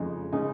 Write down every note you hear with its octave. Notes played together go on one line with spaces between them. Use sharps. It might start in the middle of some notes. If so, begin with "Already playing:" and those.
Already playing: F2 C#3 G#3 D#4
C#3 G#3 D#4